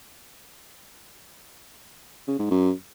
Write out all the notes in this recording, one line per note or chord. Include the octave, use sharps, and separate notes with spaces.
C#3
G#2
F#2